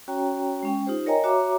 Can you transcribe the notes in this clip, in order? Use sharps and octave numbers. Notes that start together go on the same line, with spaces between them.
C#4 F#4 C#5 G5 A#5
G#3 C#4 G5
D#4 F4 G4 C5
A#4 C#5 D#5 G5 G#5 A#5
F#4 C#5 E5 A#5 D6